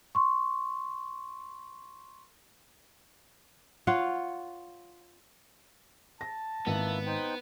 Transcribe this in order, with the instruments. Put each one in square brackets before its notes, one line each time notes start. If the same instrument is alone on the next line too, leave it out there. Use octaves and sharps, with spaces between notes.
[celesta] C6 C#6
[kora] F4 C#5 F5 F#5
[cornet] A5 [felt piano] A#6
[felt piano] G#1 [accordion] A#3 E4 E6 [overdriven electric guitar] B3
[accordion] D#4 C5 G5